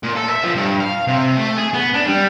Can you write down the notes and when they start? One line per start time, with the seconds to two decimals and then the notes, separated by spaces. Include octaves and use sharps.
0.03 A#2
0.16 A4
0.30 E5
0.44 F3
0.56 G2
0.81 F5
1.07 C3
1.36 A3
1.57 G#4
1.74 B3
1.94 D4
2.07 G3